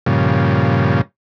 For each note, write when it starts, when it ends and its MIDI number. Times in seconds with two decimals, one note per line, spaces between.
0.06 1.01 43
0.06 1.01 46
0.06 1.01 49
0.06 1.01 53